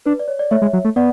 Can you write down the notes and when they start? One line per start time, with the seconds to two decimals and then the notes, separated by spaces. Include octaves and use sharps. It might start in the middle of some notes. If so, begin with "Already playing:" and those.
0.06 D4 B4
0.19 D5
0.28 C#5
0.39 D5
0.51 A3 C#5 E5
0.62 G#3
0.73 F#3
0.85 A3
0.96 B3 D5 F#5